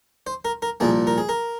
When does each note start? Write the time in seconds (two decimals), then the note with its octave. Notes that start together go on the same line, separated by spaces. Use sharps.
0.27 C5
0.45 A#4
0.62 A#4
0.80 C2 A#2 F3 A#3 G#4
1.07 A#4
1.18 G#4
1.29 A#4